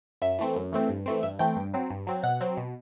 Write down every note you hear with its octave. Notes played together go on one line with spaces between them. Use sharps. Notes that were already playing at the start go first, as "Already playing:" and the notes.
F#2 E5
E3 A3 C4
F#2
E3 A3 C4
G2
E3 A3 C4
G2 E5
E3 A3 C4 G5
G2
F#3 C4
G2
F#3 C4
B2 F#5
F#3 C4
B2